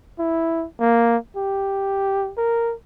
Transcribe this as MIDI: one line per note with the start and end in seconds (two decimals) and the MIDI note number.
0.19 0.66 64
0.80 1.17 58
1.36 2.32 67
2.38 2.74 70